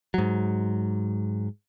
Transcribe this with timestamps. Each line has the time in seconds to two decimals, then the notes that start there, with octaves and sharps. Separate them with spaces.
0.14 G#2 F#3